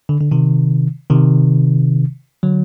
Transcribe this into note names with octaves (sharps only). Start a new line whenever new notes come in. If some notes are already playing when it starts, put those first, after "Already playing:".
D3
D3
C3 D#3
C3 D#3
D3 F#3